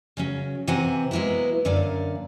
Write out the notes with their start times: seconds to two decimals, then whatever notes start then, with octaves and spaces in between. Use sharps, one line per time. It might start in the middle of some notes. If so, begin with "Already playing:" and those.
0.17 C#3 F#3 C#4
0.67 C3 E3 C4 F#5 G#5 A#5
1.11 F#3 G#3 A#3 B3 E4
1.65 F#2 D3 A#3 D5 F5